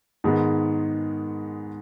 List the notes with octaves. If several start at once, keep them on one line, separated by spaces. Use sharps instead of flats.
G#2 D#3 G#3 B3